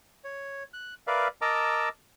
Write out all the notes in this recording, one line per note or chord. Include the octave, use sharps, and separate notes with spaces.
C#5
F#6
A#4 B4 D5 E5 F5
A#4 D#5 A5 A#5 D6 E6